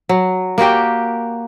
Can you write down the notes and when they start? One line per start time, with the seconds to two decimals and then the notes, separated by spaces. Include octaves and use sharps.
0.09 F#3
0.58 A#3 F#4 G4 G5